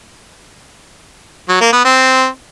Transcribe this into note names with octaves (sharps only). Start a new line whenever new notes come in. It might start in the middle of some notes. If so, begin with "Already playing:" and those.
F#3
A#3
B3
C4